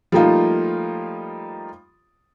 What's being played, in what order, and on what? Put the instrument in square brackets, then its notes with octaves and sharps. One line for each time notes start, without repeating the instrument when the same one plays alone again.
[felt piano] F3 G3 A3 A#3 D#4 F4